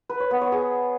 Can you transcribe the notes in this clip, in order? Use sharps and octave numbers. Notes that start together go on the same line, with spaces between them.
B4
C#5
B3
C#5
G#4